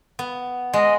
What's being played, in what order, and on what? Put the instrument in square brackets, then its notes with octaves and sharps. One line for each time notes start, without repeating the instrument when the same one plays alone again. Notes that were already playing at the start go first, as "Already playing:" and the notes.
[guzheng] B3
[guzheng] G#3 [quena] D#5